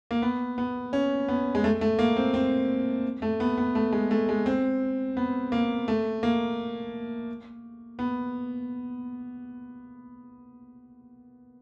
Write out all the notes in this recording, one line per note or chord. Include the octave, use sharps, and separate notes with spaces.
A#3
B3
B3
C#4
B3
G#3
A3
A3
A#3
C4
C4
A3
B3
B3
A3
G#3
A3
G#3
C4
B3
A#3
A3
A#3
B3